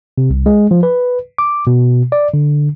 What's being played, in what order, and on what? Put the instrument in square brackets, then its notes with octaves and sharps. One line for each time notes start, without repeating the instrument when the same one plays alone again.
[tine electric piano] C3
C2
G#3
F3
B4
D6
B2
D5
D3